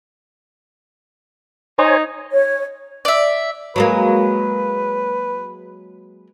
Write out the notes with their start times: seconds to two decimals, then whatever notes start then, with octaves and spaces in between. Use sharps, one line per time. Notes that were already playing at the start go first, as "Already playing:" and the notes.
1.78 D#4 C5 C#5 G#5
2.32 C#5
3.05 D5 E5
3.76 F#3 G#3 A#3 B4